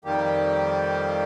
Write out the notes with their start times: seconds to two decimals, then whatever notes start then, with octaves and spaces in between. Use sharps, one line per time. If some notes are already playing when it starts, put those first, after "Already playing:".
0.05 F2 D#3 G3 A#3 G4